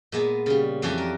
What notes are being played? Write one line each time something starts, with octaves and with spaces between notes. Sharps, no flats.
A#2 G#3 B3
C#3 G3
F2 E3 F#4 G4 D5 G#5
A#4